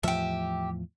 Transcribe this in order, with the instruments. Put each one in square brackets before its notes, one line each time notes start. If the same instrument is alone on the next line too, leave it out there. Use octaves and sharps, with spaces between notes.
[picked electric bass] E2 A2 F3 [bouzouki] G4 E5